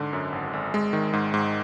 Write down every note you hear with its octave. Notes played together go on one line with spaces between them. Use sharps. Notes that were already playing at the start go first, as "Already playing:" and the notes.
Already playing: G#2 D3
F#2
G#1
G#1
G#3
D#3
G#2
G#2